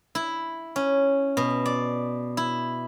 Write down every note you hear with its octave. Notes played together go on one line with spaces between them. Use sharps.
E4
C#4
B2
D5
E4